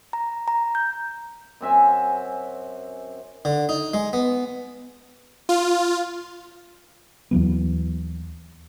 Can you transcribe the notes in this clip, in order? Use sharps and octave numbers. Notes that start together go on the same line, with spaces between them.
A#5
A#5
G6
F#2 C4 E5 G#5
D3
D#4
G#3
B3
F4
D#2 E3 F#3 B3